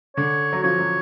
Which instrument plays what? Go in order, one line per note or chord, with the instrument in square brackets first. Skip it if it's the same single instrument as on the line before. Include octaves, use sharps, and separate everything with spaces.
[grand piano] D3 [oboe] C#5
[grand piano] F#3
[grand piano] F3 [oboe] C#5
[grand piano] F#3